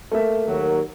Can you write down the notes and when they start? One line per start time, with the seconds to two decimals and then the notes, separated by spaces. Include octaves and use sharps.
0.11 A3 A#3 E5
0.46 D#2 F#3 A#4